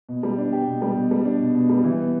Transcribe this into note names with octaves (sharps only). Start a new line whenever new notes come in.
B2
G3
D4
G4
B2
G3
B2
G3
D4
B2
B2
G3
E3
B3